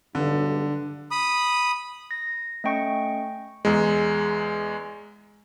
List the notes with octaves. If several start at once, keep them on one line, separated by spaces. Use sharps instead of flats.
B1 G2 D3
B5 D#6
A#6
A3 C#4 D#5 G5 C#6 C#7
E2 G#3